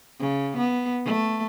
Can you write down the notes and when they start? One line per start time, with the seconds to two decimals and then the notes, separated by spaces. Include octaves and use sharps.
0.20 C#3
0.58 B3
1.05 A3